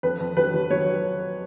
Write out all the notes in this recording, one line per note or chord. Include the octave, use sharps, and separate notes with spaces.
F2 B4
F2
F#3 B4
F#3
F#3 C#5